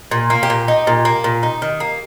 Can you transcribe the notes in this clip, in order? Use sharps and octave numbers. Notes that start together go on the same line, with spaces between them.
A#2
A#3
G4
A#2
D#4
A#2
A#3
A#2
D#4
D#3
A#3